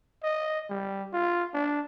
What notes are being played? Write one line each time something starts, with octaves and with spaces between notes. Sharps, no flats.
D#5
G3
F4
D4